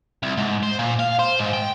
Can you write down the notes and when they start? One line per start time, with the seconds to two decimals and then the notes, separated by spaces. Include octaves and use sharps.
0.23 C2
0.37 G#2
0.63 C5
0.79 A#2
0.99 F5
1.19 C5
1.39 G#2
1.54 G5